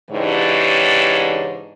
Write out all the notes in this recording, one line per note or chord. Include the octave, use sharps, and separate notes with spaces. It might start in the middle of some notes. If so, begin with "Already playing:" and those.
G#2 C#3 E3 D4 G4 C#5